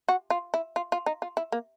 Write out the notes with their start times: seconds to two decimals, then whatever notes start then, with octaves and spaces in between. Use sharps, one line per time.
0.08 F#4
0.30 F4
0.54 E4
0.76 F4
0.92 F4
1.06 D#4
1.22 F4
1.37 E4
1.52 A#3